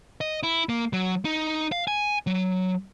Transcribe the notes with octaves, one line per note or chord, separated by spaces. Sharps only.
D#5
E4
A#3
F#3
D#4
F5
G#5
F#3